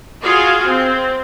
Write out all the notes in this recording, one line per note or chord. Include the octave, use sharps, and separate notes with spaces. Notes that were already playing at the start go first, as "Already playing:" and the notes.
F4 F#4 G#4 F5 G#5
C4